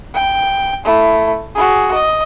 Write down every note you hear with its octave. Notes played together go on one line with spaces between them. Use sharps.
G5
A3 E4
F#4 G#4
D#5